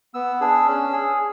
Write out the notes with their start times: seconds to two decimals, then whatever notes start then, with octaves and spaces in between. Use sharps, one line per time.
0.14 B3 E6
0.41 D4 G#4 E6
0.67 C#4
0.93 G#4